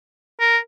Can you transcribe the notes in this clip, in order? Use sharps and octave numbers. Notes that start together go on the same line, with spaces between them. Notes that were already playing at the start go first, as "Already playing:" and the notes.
A#4